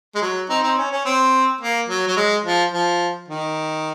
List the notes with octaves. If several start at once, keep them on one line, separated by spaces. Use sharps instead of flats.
G#3
F#3
C4 D#4
C4 D#4
C#4
C#4
C4
A#3
F#3
F#3
G#3
F3
F3
D#3